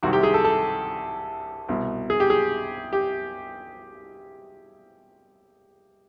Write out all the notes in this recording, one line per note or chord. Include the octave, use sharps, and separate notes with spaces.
C2 C3 D#3 F#4
G4
G#4
A4
A4
C2 B2
G#4
G4
G#4
G4